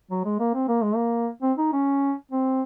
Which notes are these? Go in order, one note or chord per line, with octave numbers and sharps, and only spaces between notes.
F#3
G#3
A#3
C4
A#3
G#3
A#3
C4
D#4
C#4
C4